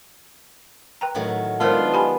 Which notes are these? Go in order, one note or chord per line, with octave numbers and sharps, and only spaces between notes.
B4 G5 A#5
A2 D#3 F#3
D#3 G#3 B3 D4 F4 A#4 C5
G4 G#5 B5